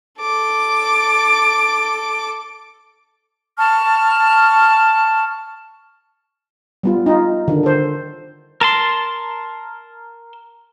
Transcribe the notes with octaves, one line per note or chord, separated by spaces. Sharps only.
A4 D6
A5 C#6 F6
G3 B3 F4
D#4 F4
D3 D#3
A4 C5
A#4 A5 C6